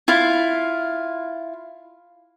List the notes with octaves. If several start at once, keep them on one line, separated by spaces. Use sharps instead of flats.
E4 F4 F5